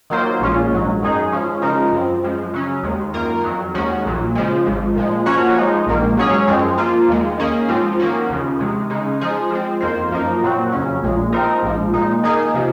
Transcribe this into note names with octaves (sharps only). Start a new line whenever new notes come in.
D#3 F#3 A#3 F4 C5
A#1 A#2 G#3 C#4 F4
A#1 G#2 F#3
F#2 D#3 G#3 D#4 G#4
F3 G#3 C#4
C#3 F3 G#3 D#4 A#4
F#2 F3 C4
F#2 F3 G#3
C#3 F#3 C#4
D#2 D#3 G#3
F#2 D#3 A#3 F4 A#4
F2 D#3 F#3
D#2 D#3 G#3 C#4 F#4
A#1 A#2 F#3
C#3 F3 G#3
G#1 G#2 F3
A#2 F3 G#3
F3 A#3 C#4 F#4 C#5
F3 G#3 D#4
A#1 G#2 D#3 A#3
G#2 F#3 C#4 G#4 C#5
F#2 F3 G#3 C4
F3 A#3 F4
D#2 D#3 G#3
D#3 A#3 C#4 G#4
G#2 F3 C4 F4
D#3 A#3 C#4 F#4
D#2 C#3 F3
C3 D#3 G#3
C#3 G#3 D#4
F3 G#3 D#4 G#4 C5
F3 G#3 C4
F2 D#3 A#3 F4 C5
F#2 F3 A#3 D#4 A#4
A#2 F#3 C4 F#4
F2 C#3 F#3 C#4
A#1 A#2 G#3
F3 C4 D#4 A#4
A#1 G#2 F3
A#2 G#3 D#4
D#3 A#3 D#4 G#4
C3 F3